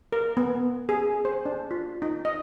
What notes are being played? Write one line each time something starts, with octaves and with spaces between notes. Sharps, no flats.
A#4
B3
G#4
C5
D4
F4
D#4
D#5